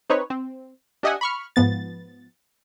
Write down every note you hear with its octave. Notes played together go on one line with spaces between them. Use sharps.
C4 D#4 B4 C#5
C4
D4 G4 D#5 E5 F#5 G#5
B5 C#6 F6
G#2 F3 B3 A6